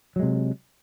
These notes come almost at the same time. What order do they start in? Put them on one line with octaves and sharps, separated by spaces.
F#3 G#3 C3